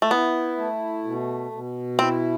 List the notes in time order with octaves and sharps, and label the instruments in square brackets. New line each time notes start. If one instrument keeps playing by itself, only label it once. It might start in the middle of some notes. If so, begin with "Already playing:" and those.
[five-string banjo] A3
[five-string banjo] B3 [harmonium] E4
[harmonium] A3
B2
B2
[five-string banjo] C4 [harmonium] E4